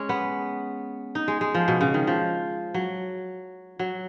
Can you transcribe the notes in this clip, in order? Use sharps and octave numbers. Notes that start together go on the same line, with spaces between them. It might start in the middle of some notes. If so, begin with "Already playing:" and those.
Already playing: G#3 C#4
B3
D#4
G#3
G#3
F3
B2
C#3
D#3
F3
F#3
F#3